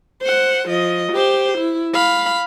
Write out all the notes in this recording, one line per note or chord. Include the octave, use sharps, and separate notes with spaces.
C5 F#5
F3 D#5
G4 C5
E4
F5 B5